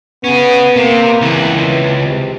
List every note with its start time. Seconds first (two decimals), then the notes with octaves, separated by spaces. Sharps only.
0.24 B3 C#4 G#4
0.76 C3 A#3
1.21 C#2 E3 B4
2.04 C3